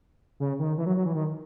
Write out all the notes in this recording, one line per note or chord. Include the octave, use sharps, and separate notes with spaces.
C#3
D#3
E3
F#3
F#3
E3
D#3